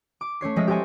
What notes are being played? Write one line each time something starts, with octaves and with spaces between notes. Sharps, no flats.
D6
A3 C#4 C#5 C7
F3 G#3 F4 D#5 E5
G4 A4 C5 D#5 G#5 C#6